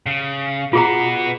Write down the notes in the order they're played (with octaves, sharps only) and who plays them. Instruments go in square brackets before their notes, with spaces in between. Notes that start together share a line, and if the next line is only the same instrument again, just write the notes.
[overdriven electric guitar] C#3
[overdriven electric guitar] B2 B3 [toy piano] F4 G#4 A#5